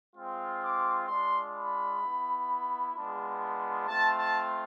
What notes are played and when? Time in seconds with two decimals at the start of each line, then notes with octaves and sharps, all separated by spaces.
0.15 G#3 C4 F4
0.62 D6
1.08 G#3 D4 F4 C6
1.55 B5
2.01 B3 E4
2.94 G#3 B3 D4 F4
3.87 A3 C4 F4 A5
4.18 A5